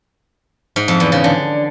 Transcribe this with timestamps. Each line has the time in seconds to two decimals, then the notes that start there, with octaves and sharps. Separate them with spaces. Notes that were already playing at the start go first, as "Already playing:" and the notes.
0.76 G#2
0.88 F2
1.00 E2
1.12 C#3
1.24 D3